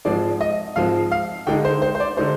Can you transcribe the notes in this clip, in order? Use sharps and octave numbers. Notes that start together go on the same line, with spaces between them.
G#2 F3 G#3 C4 D5
D#5
G#2 F3 G#3 C4 F5
F5
D3 G#3 D#4 G5
C5
C5
C5
D5
D3 G#3 D#4 C5